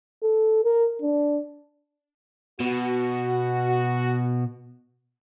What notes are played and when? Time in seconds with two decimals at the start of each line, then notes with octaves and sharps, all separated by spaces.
0.23 A4
0.64 A#4
1.02 D4
2.60 B2 F#4